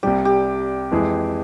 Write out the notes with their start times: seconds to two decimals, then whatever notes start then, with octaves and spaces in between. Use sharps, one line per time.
0.03 C2 C3 G3 G4
0.25 G4
0.91 F2 E3 G#3 E4 G#4